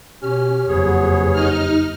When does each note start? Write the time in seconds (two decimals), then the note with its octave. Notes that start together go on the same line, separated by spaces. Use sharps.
0.22 B2 C#4 G4 F6
0.68 F#1 F2 B3 G#4 C#5
1.32 D#4 F6